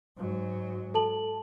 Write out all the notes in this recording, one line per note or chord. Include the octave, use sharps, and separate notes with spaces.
G#2 F#3
A4 A5 F#7